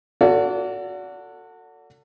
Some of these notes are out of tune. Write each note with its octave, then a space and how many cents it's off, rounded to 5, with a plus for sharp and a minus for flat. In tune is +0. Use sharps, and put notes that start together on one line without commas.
F#4 -10 A4 +30 D5 -35